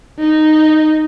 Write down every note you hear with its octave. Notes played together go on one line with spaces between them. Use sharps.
D#4